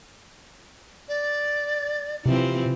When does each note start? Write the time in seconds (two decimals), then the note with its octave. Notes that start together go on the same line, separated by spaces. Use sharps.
1.08 D5
2.26 C3 E3 F3 C4